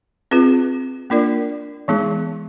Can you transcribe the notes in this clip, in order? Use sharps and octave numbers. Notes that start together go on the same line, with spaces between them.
C4 F4 G#4 B4
A#3 D4 F4 A#4 D5
E3 G#3 B3 D#4 G#4